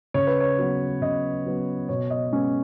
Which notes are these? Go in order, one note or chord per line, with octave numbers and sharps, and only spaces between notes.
C#3 C#5
B4
C#5
F#3 B3
C#3 D#5
F#3 B3
B2 C#5
D#5
G#3 B3 C#4